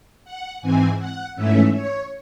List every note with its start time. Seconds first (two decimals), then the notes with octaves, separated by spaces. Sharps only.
0.24 F#5
0.61 G#2 E3 C4 G#5
0.98 F#5
1.36 G#2 E3 A3 C#4 E5
1.73 C#5